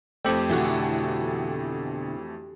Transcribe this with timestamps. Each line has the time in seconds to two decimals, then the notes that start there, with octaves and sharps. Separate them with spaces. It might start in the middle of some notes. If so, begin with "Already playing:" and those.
0.25 F2 A3 C4 G4 G5
0.49 B2 D3 E3 D4 F#4